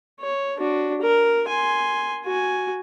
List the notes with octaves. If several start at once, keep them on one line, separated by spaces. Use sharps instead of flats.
C#5
D4 F#4
A#4
G#5 C6
F#4 G#5